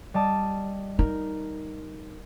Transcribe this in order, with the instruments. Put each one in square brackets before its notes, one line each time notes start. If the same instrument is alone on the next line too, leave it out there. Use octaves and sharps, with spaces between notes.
[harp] G3 D#5 A5
[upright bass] D#4 [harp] A#4